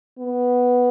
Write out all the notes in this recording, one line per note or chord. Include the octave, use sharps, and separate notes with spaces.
B3